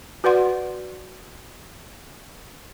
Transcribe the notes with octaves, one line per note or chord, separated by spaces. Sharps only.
F#4 B4 D5 F#5 C6